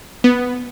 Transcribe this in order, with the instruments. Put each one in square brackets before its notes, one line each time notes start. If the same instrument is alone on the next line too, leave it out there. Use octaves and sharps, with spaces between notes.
[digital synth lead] B3